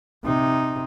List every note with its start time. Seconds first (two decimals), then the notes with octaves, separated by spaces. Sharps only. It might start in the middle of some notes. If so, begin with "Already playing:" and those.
0.24 C3 D#4